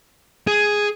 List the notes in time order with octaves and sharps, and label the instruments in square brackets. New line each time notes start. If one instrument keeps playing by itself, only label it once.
[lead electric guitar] G#4